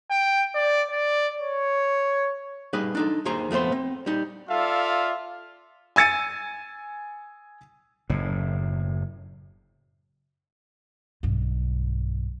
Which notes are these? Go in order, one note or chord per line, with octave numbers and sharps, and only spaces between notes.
G5
D5
D5
C#5
G3 D#4 G#4 B4
D4 D#4 A4
D#2 D#3 G#4 C5 A#5
F2 A3 B3 C5 C6
C4
G3 D#4
F4 A4 D5 E5 F5
G#5 E6 A6 C#7 D#7
F#1 A2
B1 G2